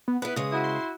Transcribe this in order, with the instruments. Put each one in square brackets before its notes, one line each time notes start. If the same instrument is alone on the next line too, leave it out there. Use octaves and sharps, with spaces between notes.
[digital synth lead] B3
[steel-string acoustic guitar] B3 E4 [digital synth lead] B4
[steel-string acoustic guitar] C#3 G#3 [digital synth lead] D#6
[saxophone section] E4 F#4
[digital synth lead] C6